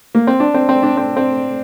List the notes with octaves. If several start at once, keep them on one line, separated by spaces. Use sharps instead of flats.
A#3
C4
D4
C4
C4
D4
C4
C4